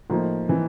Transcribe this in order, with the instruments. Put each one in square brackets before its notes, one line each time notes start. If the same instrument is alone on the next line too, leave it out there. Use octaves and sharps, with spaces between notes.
[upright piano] A2 F3 A#3 D#4
[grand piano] E3